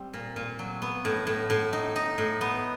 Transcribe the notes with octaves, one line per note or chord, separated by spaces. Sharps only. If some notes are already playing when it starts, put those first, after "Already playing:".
Already playing: G3 C4
A#2
A#2
F#3
B3
A2
A2
A2
D#4
D#4
A2
B3